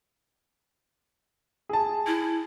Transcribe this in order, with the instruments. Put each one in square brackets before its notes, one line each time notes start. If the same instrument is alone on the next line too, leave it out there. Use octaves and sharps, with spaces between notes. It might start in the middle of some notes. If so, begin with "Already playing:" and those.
[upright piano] G#4 A5
[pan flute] E4